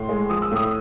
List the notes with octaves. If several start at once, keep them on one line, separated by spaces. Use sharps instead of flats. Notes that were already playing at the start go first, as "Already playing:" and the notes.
Already playing: A2 C6
G#3
F3 D#6
E6
A2 D#6